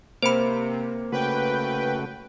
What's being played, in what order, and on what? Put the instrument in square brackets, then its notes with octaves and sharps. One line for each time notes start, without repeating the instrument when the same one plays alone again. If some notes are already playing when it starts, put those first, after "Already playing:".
[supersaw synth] C3 [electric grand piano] A#3 C#7 [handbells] C5 B5
[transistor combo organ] C#3 A3 F#4 [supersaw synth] B4 G5